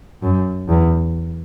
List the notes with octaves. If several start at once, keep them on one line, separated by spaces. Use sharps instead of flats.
F#2
E2